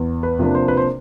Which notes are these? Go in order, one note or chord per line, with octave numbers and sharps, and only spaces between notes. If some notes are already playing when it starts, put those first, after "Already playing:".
Already playing: E2
B4
C3 F3 A#3 D4
C5
B4
C5